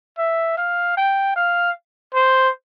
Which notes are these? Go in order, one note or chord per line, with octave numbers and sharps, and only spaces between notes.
E5
F5
G5
F5
C5